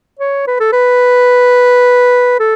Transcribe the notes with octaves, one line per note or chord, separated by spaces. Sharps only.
C#5
B4
A4
B4
A4